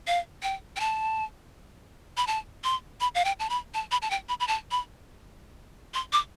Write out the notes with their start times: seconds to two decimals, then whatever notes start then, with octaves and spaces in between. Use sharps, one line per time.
0.07 F5
0.43 G5
0.76 G5
0.80 A5
2.17 B5
2.27 A5
2.64 C6
3.01 B5
3.15 F5
3.25 G5
3.40 A5
3.50 B5
3.74 A5
3.92 B5
4.02 A5
4.11 G5
4.29 B5
4.40 B5
4.48 A5
4.71 B5
5.94 C6
6.13 D6